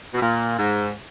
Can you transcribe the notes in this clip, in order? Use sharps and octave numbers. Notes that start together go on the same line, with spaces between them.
B2
A#2
G#2